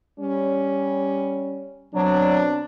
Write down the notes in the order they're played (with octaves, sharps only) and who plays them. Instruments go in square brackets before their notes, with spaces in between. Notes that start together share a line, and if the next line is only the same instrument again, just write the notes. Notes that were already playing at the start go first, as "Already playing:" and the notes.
[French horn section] G3 C#4
[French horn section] B2 C4 D4 [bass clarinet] F#3